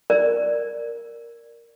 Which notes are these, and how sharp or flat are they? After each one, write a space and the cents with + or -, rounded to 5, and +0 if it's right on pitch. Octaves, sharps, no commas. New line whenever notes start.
A#4 +0 D5 +0